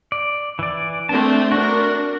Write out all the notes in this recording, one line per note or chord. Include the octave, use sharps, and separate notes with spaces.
D5
E3 D5
A3 C4 D4 A5
D4 F#4 A#4